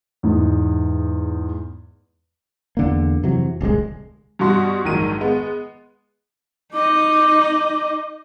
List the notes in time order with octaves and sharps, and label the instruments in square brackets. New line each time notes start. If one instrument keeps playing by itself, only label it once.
[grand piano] E2 G#2
[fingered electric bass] E2 D3 A#3
F2 C3 E3 F#3
D1 C2 B2 G#3
[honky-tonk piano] G2 B2 G3 F#4 C6
A#1 G#2 D#3 F#3 A#4 D#7
G#3 B3
[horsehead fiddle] D#4 D#5 [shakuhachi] D6